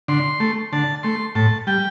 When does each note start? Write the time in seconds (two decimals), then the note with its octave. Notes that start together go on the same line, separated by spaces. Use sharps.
0.08 D3 C6
0.40 A3
0.73 D3 A5
1.03 A3 C6
1.35 A2 A5
1.67 G3 G5